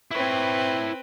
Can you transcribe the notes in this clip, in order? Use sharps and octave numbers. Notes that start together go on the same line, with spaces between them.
C4 E4 B4 C#5